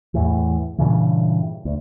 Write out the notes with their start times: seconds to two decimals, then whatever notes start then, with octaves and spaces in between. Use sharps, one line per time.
0.14 E2 A2 E3
0.78 G2 A#2 C#3 E3
1.65 D2